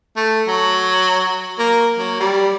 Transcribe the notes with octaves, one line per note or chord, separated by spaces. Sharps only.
A3
F#3
A#3
F#3
G3